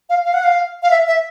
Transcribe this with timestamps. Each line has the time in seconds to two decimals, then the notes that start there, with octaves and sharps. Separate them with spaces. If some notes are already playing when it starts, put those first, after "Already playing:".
0.09 F5
0.25 F5
0.34 F#5
0.43 F5
0.82 F5
0.91 E5
1.08 E5